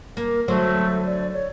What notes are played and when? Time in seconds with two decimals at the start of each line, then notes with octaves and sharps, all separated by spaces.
0.17 A#3 A#4
0.48 D3 F#3 A3 C5
1.06 D5
1.33 C#5